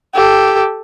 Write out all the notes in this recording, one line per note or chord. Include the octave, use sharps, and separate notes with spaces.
G4 A4